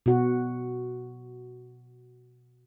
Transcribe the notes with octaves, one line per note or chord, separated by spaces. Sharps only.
B2 F#4